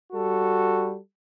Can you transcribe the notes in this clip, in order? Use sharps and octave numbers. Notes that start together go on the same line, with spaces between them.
G3 F#4 A4